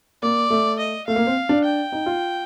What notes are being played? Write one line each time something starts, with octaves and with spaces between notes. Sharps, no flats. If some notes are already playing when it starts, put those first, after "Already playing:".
A#3 D5
A3
D#5
A3 F5
A#3
C4
D4
G5
D#4
F4